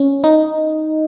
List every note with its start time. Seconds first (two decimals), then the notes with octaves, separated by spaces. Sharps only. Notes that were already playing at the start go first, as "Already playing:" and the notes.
Already playing: C#4
0.24 D#4